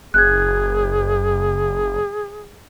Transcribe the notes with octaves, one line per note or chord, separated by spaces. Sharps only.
F#1 G#4 F#6 G#6